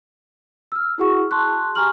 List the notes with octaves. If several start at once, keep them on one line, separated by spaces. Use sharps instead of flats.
E6 F6
E4 F#4 G#4 F#5 C#6
A5 C6 C#6 F#6
G4 G#5 A#5 C#6 F6 F#7